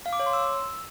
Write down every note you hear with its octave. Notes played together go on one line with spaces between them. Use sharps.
F5
D6
C#5
C6
E6